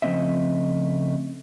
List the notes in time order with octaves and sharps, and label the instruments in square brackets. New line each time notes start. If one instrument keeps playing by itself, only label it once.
[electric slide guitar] C#3 F3 A3 C4 D#5 E5